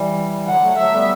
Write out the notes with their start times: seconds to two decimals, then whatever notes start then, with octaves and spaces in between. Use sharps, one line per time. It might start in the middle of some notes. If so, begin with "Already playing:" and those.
Already playing: E3 G3
0.47 D3 F#3 F#5
0.62 F#3 A3
0.77 F#3 A3 E5
0.92 G3 B3